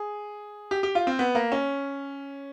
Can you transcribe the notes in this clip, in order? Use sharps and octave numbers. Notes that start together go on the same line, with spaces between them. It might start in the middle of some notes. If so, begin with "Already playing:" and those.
Already playing: G#4
G4
G4
F4
C4
B3
A#3
C#4